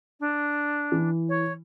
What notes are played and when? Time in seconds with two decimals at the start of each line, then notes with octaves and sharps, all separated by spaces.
0.20 D4
0.92 E3
1.28 C#5